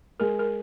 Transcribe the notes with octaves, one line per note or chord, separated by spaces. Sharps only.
G#3 A#4
A#4